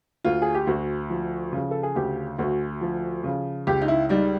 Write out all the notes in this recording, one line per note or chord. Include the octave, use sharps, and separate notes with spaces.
D2 F4
G#4
G4
D2 F#4
F3
C#3
A4
G#4
D2 G4
D2 F#4
F3
C#3
C#2 G4
D#4
E4
G3 D#4